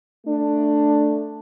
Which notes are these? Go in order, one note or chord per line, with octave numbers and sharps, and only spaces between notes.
A3 D4